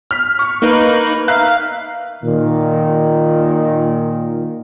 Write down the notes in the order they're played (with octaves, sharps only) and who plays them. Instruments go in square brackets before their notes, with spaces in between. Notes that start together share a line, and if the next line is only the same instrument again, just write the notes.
[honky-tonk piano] F6 B6
C#6 F6
[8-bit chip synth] A#3 D#4 B4
[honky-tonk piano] E5 A#5 F#6 [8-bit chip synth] F5
[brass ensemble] A#2 D#3